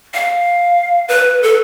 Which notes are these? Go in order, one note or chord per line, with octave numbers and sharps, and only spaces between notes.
F5
B4
A4